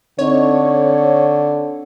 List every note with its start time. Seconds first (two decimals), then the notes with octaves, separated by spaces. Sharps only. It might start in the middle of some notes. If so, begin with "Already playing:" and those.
0.19 D3 C4 D#4 C#5 D#5